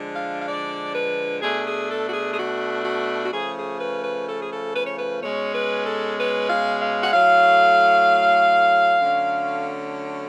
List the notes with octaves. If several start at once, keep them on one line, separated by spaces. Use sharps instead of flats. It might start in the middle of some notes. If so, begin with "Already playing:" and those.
Already playing: D3 F3 G#3 D4
F5
F5
D5
B4
B2 A3 D4 G#4
G#4
A4
F#4
G#4
G#4
F#4
F#4
F#4
C#3 F3 A3 G#4
G#4
B4
B4
A4
G#4
A4
B4
C#5
B4
B2 G#3 C#4 C#5
B4
A4
B4
F5
F5
F#5
A2 F#3 A3 F5
D3 F#3 A3 C#4